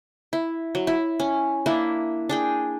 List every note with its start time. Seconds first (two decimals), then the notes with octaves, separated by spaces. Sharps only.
0.33 E4
0.75 F#3
0.87 E4
1.20 C#4
1.66 A#3 D4 E4
2.29 D4 G#4 G5